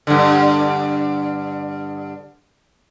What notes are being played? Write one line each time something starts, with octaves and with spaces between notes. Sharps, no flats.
G2 D3